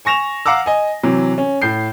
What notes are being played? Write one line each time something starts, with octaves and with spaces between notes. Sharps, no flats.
G#5 C#6 A#6 E7 F7
F5 F#5 A#5 D6 E6
D#5 G#5
C3 E3 F#3
C#4
A2 G6 C7